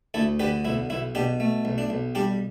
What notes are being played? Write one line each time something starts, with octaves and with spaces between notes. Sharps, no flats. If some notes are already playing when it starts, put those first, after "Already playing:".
D2 E4 A4
D3 G4 B4
B1 E4
B1 E4
B2 D4 G4
A3
B1
D4
B1
G3 D4 G4